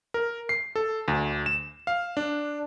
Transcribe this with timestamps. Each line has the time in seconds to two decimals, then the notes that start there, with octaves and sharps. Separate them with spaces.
0.14 A#4
0.49 C7
0.76 A4
1.08 D2
1.46 E7
1.87 F5
2.17 D4